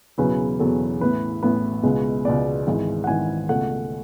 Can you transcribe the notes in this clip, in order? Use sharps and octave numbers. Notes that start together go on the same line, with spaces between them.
E1 E2 C#3 F#3 B4
E1 E2 C#3 F#3 A4
A1 A2 E3 B3 B4
A1 A2 E3 B3 B4
C#2 B2 G#3 B3
C#2 B2 G#3 B3 D5
G#1 G#2 E3 G#3
F#5
G#1 G#2 E3 G#3 G#5
C#2 B2 A3 F#5